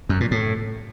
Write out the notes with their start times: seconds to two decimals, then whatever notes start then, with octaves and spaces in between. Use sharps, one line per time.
0.09 F#2
0.20 A#2
0.31 A2